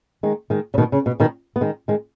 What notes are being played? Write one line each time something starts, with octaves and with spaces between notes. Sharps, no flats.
D#3 G#3
D#3 G#3
C#3
B2 D#3
C#3
B2
B2 D#3
B3
D#3 G#3
D#3 G#3